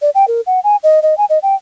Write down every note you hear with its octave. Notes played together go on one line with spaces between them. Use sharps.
D5
G5
A#4
F#5
G#5
D#5
D#5
G#5
D#5
G5